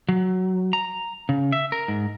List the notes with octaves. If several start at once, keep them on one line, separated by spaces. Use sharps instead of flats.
F#3
A#5
C#3
E5
A#4
G#2